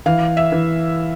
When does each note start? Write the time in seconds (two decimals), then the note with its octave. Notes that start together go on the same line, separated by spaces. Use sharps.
0.06 E3 F5
0.37 E5
0.52 E3